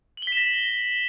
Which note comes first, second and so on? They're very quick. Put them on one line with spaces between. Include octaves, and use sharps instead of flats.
F#7 G7 B6 E7 A#6